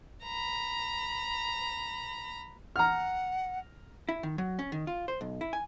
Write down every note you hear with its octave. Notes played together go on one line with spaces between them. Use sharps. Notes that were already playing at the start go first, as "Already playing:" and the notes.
A#5 B5
F#5 A#5 F6
E4
D#3
F#3
C#4
D#3
F4
C5
B1
E4
G#5